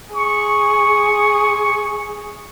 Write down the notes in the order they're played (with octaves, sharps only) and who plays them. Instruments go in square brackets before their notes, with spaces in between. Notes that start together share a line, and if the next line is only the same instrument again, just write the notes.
[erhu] G#4 [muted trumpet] C#6